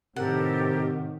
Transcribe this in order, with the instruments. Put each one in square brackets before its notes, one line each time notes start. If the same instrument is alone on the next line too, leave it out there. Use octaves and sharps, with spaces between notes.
[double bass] A2 D#3 [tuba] C3 [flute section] G4 A4 A#4 [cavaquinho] F#5